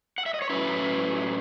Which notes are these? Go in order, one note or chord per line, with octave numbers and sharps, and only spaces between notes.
F#5
E5
D#5
C#5
A2 F#3 C#4 E4 B4